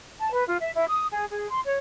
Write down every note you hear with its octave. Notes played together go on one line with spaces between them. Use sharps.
A5
B4
F4
E5
E4
D#6
G#4
G#4
C6
C#5